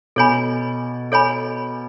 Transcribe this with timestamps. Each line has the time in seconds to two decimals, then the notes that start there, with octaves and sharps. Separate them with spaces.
0.16 B2 A4 C#5 G#5 B5
1.12 A4 C#5 G#5 B5